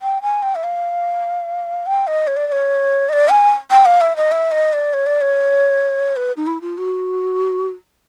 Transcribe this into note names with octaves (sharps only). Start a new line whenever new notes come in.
G5
G#5
G5
E5
F5
G5
D#5
C#5
D5
D5
C#5
D#5
D5
G#5
G5
F5
E5
D#5
E5
D#5
D5
C#5
D5
C#5
B4
D#4
E4
F4
F#4